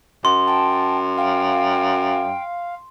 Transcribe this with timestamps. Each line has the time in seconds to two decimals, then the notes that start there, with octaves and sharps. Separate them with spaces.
0.25 F#2 C6
0.47 G5 A5
1.17 F5 G5